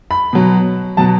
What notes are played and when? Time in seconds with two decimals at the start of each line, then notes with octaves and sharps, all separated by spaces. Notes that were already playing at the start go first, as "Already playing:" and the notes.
0.11 B5
0.33 B2 F#3
0.97 B2 F#3 A5